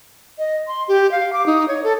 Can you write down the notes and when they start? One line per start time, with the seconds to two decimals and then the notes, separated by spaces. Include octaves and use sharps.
0.38 D#5
0.67 C6
0.88 G4
1.11 F5
1.33 D6
1.46 D#4
1.68 C#5
1.84 A4